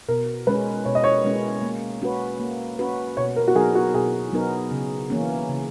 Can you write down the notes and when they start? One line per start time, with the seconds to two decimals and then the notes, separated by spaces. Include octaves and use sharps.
0.08 B2 A#4
0.47 G#3 C#4 B4
0.85 B2 C#5
0.95 D#5
1.04 C#5
1.24 G#3 C#4
1.62 A#3
2.02 C#4 F#4 B4
2.40 A#3
2.79 C#4 F#4 B4
3.17 B2 C#5
3.36 A#4
3.48 F#4
3.55 F#3 B3 D#4 G#4 A#4
3.75 F#4
3.94 B2 G#4
4.32 F#3 B3 D#4 A#4
4.71 C#3
5.10 E3 A#3 C#4
5.49 C#3